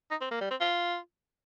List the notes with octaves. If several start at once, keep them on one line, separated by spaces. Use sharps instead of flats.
D#4
C4
A#3
G3
C4
F4